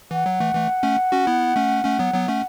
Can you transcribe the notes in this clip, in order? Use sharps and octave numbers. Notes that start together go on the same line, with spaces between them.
E3 F#5
F#3
E3 A3
E3 A3
A3 C#4
C#4 F#4
B3 E4
A3 C#4
A3 C#4
F#3 B3
F#3 B3
A3 C#4